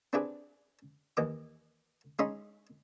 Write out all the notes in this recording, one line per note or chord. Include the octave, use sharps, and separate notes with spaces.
C4 D4 E4 G4 G#4 B4
D#2 E3 D#5 D6
G#3 C#4 D#4 D#5 B5 C6